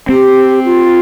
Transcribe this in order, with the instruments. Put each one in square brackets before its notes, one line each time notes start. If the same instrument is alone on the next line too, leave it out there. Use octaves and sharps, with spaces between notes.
[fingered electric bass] C4 [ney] G4
[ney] F4